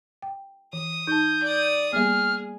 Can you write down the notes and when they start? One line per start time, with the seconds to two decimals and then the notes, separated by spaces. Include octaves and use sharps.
0.22 G5
0.73 E3 D#6
1.07 D#4 A5 G6
1.43 D5 D#6
1.93 G3 A#3 B3 G#4 F6